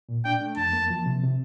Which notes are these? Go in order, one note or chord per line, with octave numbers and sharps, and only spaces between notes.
A#2
D4 G5
A3
F2 A5
A#3
F3
C3
C3